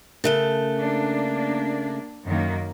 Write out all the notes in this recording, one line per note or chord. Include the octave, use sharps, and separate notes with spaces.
C#3 A3 A4 A#4 F#6 G7
A#3 D4
F#2 D#3 A#3